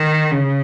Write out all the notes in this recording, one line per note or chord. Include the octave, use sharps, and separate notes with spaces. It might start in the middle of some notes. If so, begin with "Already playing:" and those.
Already playing: D#3
C#3